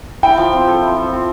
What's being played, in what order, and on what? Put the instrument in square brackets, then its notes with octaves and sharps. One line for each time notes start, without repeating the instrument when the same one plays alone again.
[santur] E4 [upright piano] G5
[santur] F3
C4
A4
E4
F3
C4